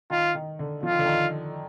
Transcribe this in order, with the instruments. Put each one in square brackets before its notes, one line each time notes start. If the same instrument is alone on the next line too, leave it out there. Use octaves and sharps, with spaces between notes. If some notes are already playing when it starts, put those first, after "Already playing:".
[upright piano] D#3 [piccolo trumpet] F4
[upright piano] D#3
D3
[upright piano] F3 [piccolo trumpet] F4
[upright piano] D#3
D3
D#3